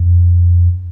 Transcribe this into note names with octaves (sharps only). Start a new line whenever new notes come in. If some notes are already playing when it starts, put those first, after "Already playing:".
Already playing: F2